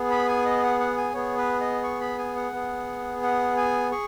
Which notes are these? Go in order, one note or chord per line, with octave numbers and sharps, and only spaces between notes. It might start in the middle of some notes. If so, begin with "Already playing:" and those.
Already playing: B3 G#4
B5
G#5
D#5
F#5
F#5
G#5
B3 G#4 C#5
B4
D#5
C#6
B5
G#5
F#5
B3 G#4
F#5
G#5
G#4 C#6